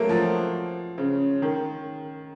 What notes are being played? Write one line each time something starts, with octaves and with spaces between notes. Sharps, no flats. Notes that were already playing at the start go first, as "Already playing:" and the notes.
Already playing: F#3 A3 A#3
F3
C#3
D#3